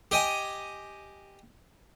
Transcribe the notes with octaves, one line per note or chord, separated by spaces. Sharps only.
G4 D#5 G#5